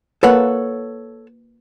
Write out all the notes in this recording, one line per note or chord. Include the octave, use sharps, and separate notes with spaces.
A#3 A4 B4 C#5 F#5